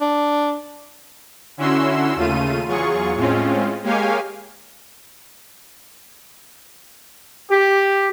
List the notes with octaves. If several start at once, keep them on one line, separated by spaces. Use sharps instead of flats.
D4
D3 C#4 E4 F#4 C6 E6
D#2 C#3 A3 F4 D#7
E2 F#3 F4 G#4 C#6
A2 G#3 C4 C#4 F4
G#3 A#3 G4 C#5 F5 G#5
G4